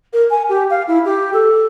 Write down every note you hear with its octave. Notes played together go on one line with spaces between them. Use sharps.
A#4
G#5
G4
F5
E4
G4
A4